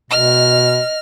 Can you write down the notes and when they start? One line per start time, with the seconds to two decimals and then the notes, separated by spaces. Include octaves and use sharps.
0.11 B2 D#5 F6